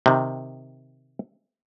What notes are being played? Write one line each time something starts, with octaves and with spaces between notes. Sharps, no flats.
C3 D#3